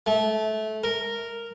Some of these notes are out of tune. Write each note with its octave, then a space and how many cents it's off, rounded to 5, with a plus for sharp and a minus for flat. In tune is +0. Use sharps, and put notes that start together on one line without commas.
A3 -20
A#4 -5